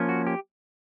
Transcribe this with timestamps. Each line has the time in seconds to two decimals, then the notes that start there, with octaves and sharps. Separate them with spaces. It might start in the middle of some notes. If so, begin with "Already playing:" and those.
Already playing: F3 A#3 C#4
0.09 F#4
0.27 G4